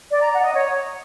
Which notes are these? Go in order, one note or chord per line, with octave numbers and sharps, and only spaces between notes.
D5
A#5
F#5
D#5
C#5